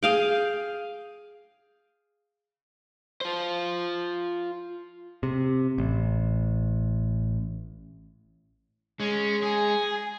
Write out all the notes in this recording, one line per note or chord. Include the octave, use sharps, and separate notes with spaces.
G#4 F5 G5
F4 C5
C3
A1
G#3 C#4
G#4 G#5